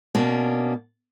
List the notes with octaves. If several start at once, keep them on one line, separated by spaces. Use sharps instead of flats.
B2 A#3 C#4 D4